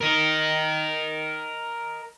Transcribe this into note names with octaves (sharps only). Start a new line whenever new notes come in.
A#4 D#5